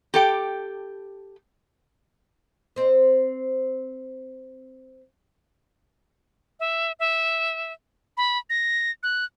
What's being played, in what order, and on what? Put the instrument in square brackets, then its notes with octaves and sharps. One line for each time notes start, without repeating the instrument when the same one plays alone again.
[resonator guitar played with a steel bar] G4 A4 G5
[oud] C4 C5
[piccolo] E5
E5
B5
A#6
F#6